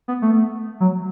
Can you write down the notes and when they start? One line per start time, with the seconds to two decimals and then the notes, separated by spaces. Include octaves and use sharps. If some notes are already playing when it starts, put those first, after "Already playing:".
0.08 B3
0.22 A3
0.80 F#3